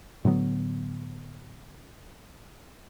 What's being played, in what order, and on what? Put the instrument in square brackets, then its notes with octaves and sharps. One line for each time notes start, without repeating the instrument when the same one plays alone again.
[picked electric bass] A2 D3 F#3 B3